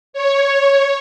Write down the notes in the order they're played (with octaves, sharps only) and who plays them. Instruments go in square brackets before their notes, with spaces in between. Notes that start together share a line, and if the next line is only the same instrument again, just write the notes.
[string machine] C#5